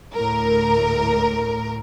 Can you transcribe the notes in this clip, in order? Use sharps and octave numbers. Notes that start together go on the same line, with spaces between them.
D2 A2 A#4